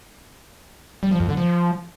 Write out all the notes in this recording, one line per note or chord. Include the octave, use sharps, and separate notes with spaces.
G3
F3
F2
D3
F3